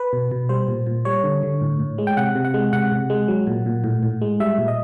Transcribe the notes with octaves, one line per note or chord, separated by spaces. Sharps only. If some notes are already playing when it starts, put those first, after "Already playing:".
Already playing: B4
B2
B2
G3 C5
A#2
A#2
G3 C#5
D3
D3
A2
A2
G#3
G5
C3 F#5
C3
F#5
G#3
C3 F#5
C3
G#3
F#3
A#2
A#2
A2
A2
G#3
G3 E5
A#2
D#5